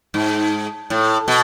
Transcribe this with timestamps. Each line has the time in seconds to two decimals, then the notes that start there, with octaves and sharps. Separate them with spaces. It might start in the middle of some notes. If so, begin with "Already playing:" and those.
0.14 G#2
0.90 A2
1.28 B2